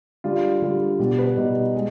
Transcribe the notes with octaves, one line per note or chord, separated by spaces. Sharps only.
D3 G3 F4
D3 G3
B2 G3
B4
B2 G3 D#4
G#3